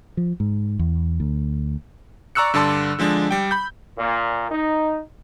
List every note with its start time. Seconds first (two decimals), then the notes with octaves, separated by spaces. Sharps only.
0.17 F3
0.40 G#2
0.79 E2
1.20 D2
2.35 D5 A#5 C#6 E6 F#6 C#7
2.54 G2 D3 D5 A5 C6 E6
2.99 D3 F3 G#3 D4
3.31 G3 G5
3.51 B5 G6
3.98 A#2
4.51 D#4